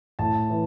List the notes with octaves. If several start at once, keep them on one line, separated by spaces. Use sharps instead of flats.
A2 A5
E3